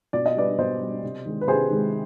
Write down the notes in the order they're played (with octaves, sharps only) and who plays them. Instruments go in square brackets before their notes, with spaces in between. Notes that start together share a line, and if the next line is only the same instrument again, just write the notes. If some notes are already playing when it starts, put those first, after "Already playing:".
[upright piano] B2 D5
D#5
G3 B4 D5
B2 C5 D#5
G3
C3
D#3 G#3
B4
C3 G#4 C5
D#3 G#3